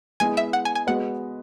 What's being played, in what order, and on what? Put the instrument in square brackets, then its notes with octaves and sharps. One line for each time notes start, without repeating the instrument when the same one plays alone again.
[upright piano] G#3 B3 E4 G#4 [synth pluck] G#5
[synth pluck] E5
F#5
G#5
G#5
[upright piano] G#3 B3 F#4 B4 [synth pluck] F#5